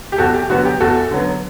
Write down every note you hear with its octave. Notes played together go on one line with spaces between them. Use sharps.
G4
E2 F#4 A4
G4
D3 F#3 B3 F#4
G4
E2 F#4 A4
D3 F#3 B3